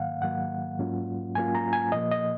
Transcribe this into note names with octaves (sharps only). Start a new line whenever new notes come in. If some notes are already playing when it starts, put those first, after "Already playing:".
Already playing: G#2 D#3 F#3 A#3 F5 F#5
G#2 D#3 F#3 A#3 F#5
G#2 F#3 A#3 C#4 F4
G#2 F#3 A#3 C#4 F4 G#5
A#5
G#5
A#2 F3 A#3 D#5
D#5